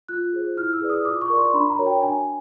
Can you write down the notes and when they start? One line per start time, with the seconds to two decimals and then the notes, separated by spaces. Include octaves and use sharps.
0.09 F4 F#6
0.33 G#4 C5
0.57 E4 F6
0.73 E6
0.81 G#4 B4 D5
0.90 D#6
1.05 F4 D6
1.21 C#6
1.29 A#4 D5
1.38 C6
1.54 D4 B5
1.70 A#5
1.79 F#4 A#4 C#5
1.86 G5
2.02 D4 G#5